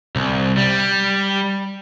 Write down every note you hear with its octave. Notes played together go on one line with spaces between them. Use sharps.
C2
G3